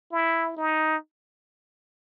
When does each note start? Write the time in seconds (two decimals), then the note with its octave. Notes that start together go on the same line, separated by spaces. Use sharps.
0.12 E4
0.56 D#4